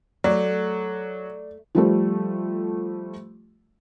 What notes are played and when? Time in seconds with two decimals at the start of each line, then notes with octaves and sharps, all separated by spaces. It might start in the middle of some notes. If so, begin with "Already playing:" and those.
0.24 F#3 A3 D5
1.75 F3 G3 A3